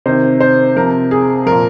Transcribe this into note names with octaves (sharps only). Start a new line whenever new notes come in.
C3 D#3 C5
C5
C3 F3 A#4
G#4
A#2 F3 A#4